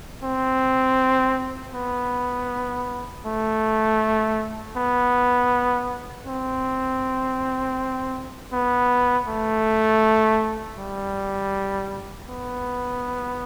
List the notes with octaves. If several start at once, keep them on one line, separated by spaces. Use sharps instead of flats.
C4
B3
A3
B3
C4
B3
A3
G3
B3